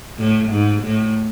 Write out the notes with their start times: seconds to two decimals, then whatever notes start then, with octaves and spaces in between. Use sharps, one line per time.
0.19 A2
0.51 G#2
0.83 A2